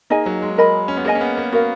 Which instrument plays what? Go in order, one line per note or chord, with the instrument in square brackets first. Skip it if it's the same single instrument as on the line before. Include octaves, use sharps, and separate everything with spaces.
[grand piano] A#3 [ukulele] D#4 G#4 D#5 G#5
[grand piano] F#3
G#3
[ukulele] A#4 D#5 G#5 B5
[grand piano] C#4
B3
[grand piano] A#3 [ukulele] G#4 D#5 G#5
[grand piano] C#4
B3
A#3
[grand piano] B3 [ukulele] F#4 A#4 F5